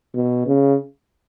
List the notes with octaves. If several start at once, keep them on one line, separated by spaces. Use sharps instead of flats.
B2
C#3